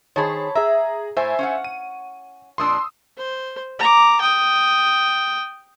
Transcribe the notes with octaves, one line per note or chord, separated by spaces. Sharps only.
D#3 G#4 C5 C#5 A5 B5
G#4 E5 A#5
A2 C5 E5 G#5
C#4 F5 F#5
D#7
F2 A#2 D4 C6 D#6 E6
C5
A#5 D6
G5 D#6